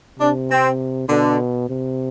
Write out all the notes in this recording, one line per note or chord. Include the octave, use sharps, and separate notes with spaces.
C3 D4
C4
B2 D3
C3